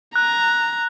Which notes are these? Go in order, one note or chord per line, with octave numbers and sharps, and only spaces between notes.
A#5 F#6